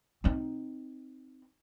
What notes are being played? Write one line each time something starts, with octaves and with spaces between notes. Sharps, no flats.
C4 D#4